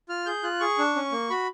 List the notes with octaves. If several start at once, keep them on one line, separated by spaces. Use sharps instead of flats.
F4 F6
G#4 G6
F4 F#6
G#4 C#6
D4
C#4
A#3
F#4 B5